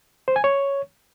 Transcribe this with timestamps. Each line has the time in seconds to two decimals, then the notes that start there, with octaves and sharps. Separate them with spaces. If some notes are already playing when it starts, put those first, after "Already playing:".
0.28 C5
0.36 G#5
0.44 C#5